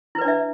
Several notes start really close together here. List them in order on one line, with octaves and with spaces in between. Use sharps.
E4 B4 D5 D4 E5